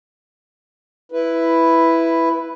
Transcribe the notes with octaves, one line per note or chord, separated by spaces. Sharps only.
E4 B4